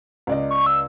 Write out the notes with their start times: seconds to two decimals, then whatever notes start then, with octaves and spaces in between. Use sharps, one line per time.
0.27 C#2 D5 D#5
0.51 C#6
0.66 E6